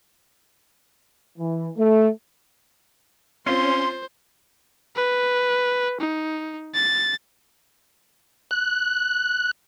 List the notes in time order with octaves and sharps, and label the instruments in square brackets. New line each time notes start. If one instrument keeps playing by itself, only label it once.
[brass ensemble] E3
A3
[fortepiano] C4 F4 [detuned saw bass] C#4 [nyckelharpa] C5 [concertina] C6
[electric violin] B4
D#4
A6
[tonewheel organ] F#6